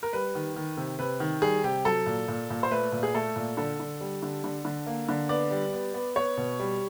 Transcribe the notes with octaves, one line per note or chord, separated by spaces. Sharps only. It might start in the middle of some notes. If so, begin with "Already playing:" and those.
A#4
G3 B4
D#3
D#3
C3
C3 B4
D#3
G3 G#4
C3 G4
F#3 A4
A#2
A#2
A#2
C5
A3 B4
A#2
G#4
A3 A4
A#2
D3 A4
D3
G3
D3
D3
D3
A#3
D3
B3 D5
G3
B3
B3
B3 C#5
B2
G3